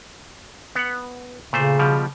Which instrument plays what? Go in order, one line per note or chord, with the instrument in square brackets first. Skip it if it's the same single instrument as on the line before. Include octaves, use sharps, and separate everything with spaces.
[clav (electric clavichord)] B3 F#5
[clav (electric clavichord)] A#2 A3 C5 [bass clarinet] C#3
[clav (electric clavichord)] B2 F3 G3